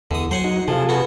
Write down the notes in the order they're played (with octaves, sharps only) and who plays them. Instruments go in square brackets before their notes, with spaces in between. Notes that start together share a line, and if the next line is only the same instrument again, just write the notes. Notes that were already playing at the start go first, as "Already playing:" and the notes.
[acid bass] E2 [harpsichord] D3 D#6
[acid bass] F#3 [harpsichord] C5 F#5 G#5
[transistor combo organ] D#4 F#4
[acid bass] C3 [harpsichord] F3 [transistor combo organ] F4 G#4 A4
[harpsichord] B3 F#4